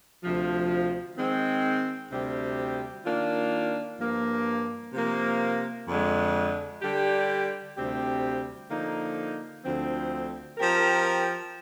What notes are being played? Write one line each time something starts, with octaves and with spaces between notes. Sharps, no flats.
D2 C3 F3
D#3 G#3 C4
D2 C3 G3 C4 G4
D#3 A#3 D4 F4
G2 F3 A#3
C3 F3 A#3
F2 D3 G#3
D3 G3 D4 G4
D2 C3 G3 C4 G4
D3 F3 A#3 D#4
D2 D3 F3 C4
F3 C4 G4 A#4